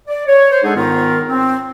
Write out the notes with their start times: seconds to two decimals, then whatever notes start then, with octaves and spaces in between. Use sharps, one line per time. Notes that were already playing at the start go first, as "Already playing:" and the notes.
0.07 D5
0.27 C#5
0.51 C5 C#5
0.63 G#3 D4 D#4 G#4 A4 F#5
0.76 G#2 D#3 B3 F4 A#4
1.28 C4